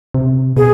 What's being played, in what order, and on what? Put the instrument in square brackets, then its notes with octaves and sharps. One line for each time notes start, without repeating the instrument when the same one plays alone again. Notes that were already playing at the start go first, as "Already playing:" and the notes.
[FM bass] C3
[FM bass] B2 [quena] G#4